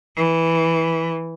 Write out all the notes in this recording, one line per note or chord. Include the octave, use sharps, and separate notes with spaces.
E3